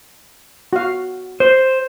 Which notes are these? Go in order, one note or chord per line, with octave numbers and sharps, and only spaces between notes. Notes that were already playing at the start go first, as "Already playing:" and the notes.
F#4 F5
C5